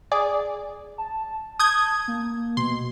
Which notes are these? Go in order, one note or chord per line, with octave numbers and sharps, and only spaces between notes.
G#4 D5
A5
A5 D#6 G6 G#6
A#3
B2 C6